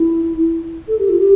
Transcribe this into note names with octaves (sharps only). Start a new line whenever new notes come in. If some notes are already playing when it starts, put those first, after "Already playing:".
Already playing: E4
A4
G4
F4
G4